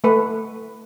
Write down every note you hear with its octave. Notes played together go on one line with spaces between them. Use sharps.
A3 B4